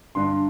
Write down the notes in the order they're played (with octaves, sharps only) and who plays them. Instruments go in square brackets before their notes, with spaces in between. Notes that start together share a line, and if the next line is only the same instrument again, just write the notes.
[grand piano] G2 D3 C6